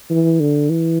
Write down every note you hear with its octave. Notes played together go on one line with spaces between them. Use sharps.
E3
D3
E3